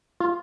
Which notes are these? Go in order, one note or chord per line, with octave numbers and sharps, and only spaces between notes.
F4